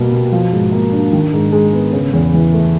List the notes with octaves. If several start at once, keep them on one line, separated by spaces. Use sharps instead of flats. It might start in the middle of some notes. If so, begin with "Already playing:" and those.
Already playing: B2 G3 A#3
B2
F3
G#2
A#3
D4
D#3
G#2
G#3
B3
C#3
E2
E3
A3